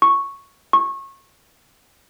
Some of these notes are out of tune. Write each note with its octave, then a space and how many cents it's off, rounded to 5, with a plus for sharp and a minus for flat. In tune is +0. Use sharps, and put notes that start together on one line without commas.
C#6 -5
C#6 -25